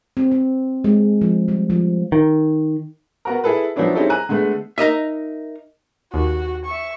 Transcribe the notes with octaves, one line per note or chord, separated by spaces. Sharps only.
C4
C4
G#3
F3
G3
F3
D#3
B3 F#4 A#4
E4 G#4 A4 B4
F3 F#3 B3 C#4 D4 E4
G3 C4 C#4 D#4 E4 A4
G#5 A#5 F#6 D#7
D3 G#3 A3 B3
D#4 A#4 D#5 E5
D#2 F#4
E5 C#6